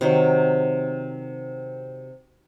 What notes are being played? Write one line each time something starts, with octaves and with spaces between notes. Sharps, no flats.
C3 D#3 F#3